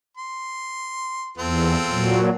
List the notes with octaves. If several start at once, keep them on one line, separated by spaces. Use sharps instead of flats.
C6
E2 C4 F4 A4
A#2 F#3